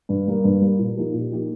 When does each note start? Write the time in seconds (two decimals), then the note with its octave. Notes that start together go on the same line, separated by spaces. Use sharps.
0.09 G2
0.27 G3 A#3
0.44 G2
0.61 G3 A#3
0.79 A#2
0.97 F3 A#3 D#4 G4
1.14 A#2
1.32 F3 A#3 D#4 G4